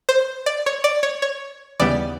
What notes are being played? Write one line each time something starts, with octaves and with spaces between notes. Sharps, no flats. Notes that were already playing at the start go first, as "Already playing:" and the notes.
C5
D5
C#5
D5
C#5
C#5
D#2 C#3 E3 G3 B3 D5